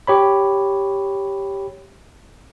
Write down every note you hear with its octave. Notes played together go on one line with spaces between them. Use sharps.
G4 C#5 B5